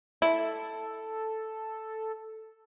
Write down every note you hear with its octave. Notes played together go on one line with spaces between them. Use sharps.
E4 A4